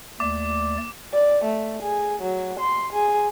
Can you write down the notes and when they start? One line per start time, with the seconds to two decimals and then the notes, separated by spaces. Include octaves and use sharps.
0.20 D#2 A3 D5 D6
1.13 D5
1.44 A3
1.82 G#4
2.22 F#3
2.59 C6
2.93 G#4